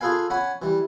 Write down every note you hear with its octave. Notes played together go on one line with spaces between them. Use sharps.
F4 G#4 A4 B4 F5 G#5
C#4 F#5 G#5 B5
E3 G3